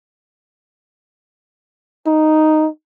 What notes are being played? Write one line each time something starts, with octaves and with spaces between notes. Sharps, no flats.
D#4